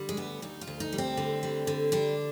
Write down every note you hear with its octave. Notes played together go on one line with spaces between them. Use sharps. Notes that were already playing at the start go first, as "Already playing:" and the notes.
Already playing: D3 G3
G#3
D2 B3
D2 D#4
F4
D2
D#4
G3
C4
D3
G3
D3
G3 D4